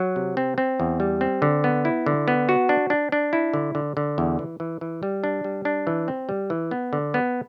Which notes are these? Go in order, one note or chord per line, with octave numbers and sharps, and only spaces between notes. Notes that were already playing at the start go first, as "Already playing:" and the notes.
Already playing: F#3
C3
C4
C4
E2
G3
C4
D3
B3
E4
D3
B3
F#4
D4
D4
D4
E4
D3
D3
D3
E2
E3
E3
E3
G3
D4
G3
D4
E3
C4
G3
E3
B3
D3
B3